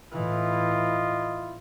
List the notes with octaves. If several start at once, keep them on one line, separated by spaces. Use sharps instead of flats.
A2 E3 E4 F4 D#5